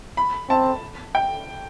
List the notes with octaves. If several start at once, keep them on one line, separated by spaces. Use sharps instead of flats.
B5
C4 A5
G5